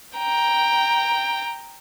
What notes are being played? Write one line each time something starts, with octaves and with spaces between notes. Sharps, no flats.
G5 A#5